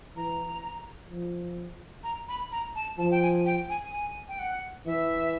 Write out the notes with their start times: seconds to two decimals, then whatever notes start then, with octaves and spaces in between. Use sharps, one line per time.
0.16 E3 A#5
1.10 F3
2.04 A#5
2.28 B5
2.52 A#5
2.75 A5
2.98 F3 A5
3.11 G5
3.22 G#5
3.46 G5
3.70 G#5
3.92 G#5
4.28 G5
4.39 F#5
4.86 E3 E5